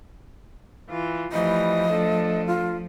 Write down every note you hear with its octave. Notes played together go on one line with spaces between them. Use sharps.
E3 F4
E3 F3 G3 A3 D#5
A3 D4 A4
F4